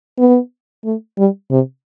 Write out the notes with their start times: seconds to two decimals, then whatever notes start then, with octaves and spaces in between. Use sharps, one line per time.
0.19 B3
0.84 A3
1.18 G3
1.51 C3